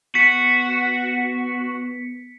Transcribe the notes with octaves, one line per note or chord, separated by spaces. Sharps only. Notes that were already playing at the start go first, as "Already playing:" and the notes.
B3 F#4 B6 C#7